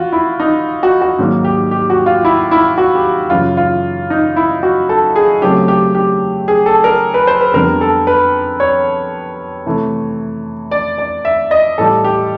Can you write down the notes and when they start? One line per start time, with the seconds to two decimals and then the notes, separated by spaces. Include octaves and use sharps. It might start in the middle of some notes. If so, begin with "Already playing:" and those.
Already playing: E3 F4 F#4
0.13 E4
0.40 D#4
0.83 F#4
1.01 F#4
1.19 G#2 D#3 F#3 A#3
1.44 G4
1.71 G4
1.90 F#4
2.06 F4
2.25 E4
2.51 E4
2.78 F#4
2.95 G4
3.30 F#2 C#3 E3 F4
3.57 F4
4.10 D#4
4.36 E4
4.63 F#4
4.89 A4
5.16 G#4
5.42 C#3 F#3 A3 C4 G4
5.68 G4
5.95 G4
6.48 G#4
6.66 A4
6.84 A#4
7.14 B4
7.27 C5
7.41 B4
7.53 F2 D3 G3 B3 A#4
7.81 A4
8.07 B4
8.60 C#5
9.66 C3 E3 A3
10.71 D5
10.98 D5
11.25 E5
11.51 D#5
11.78 A2 E3 G3 A4
12.04 G4